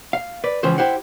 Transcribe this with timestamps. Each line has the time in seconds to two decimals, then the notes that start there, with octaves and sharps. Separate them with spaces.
0.13 F5
0.44 B4 D5
0.63 C#2 C#3 E3 F3 C5
0.78 E4 G4 C5 F#5